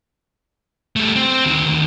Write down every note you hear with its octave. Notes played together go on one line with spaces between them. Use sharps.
G3 A3
C4
D2 D#3